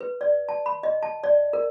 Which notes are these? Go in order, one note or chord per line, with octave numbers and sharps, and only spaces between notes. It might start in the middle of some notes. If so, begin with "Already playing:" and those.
B4
D5
A5
B5
D#5
A5
D5
A#4